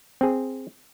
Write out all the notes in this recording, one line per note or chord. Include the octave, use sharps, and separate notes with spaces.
C4 G#4